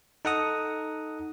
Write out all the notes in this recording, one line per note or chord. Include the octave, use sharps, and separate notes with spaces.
D#4 A4 F#5 A#5 D#6